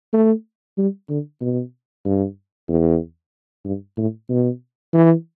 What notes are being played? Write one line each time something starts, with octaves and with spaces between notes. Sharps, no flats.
A3
G3
D3
B2
G2
E2
G2
A2
B2
E3